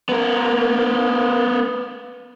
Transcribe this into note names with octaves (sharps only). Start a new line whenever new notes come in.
B3 A#4